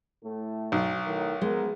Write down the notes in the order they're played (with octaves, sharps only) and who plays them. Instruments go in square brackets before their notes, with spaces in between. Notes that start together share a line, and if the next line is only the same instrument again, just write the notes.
[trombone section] A2 A3
[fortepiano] B1
[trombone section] A2 D#3 F#3
[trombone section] F3 B3 A#4 [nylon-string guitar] G#3